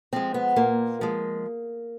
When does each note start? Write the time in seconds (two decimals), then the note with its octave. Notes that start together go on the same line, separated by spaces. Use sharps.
0.13 F3 G#3 C4
0.34 B3
0.56 A#2 A#3
1.01 F3 G#3